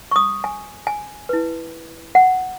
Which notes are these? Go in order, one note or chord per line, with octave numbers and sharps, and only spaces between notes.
C#6
D#6
G#5
G#5
E4 B4
F#5